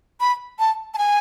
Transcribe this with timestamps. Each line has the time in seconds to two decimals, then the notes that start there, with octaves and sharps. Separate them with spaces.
0.20 B5
0.59 A5
0.94 A5
0.98 G#5